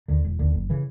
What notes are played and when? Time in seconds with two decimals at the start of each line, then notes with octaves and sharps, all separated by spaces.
0.08 D#2 D3
0.25 E1
0.39 D#2 D3
0.54 F#1
0.70 C#3 E3